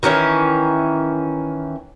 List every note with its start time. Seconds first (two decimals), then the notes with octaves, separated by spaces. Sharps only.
0.03 D#3 E3 C#4 A#4